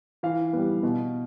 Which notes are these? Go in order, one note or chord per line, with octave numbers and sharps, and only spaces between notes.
E3 F5
G3 B3
B2